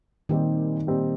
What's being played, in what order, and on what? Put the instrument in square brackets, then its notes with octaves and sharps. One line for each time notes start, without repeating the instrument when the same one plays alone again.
[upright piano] A#2 G3 C4 D#4 G4 [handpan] D#3
[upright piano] A#2 G3 C4 D#4 G4